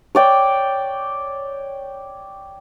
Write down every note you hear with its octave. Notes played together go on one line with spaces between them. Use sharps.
C#5 D5 G5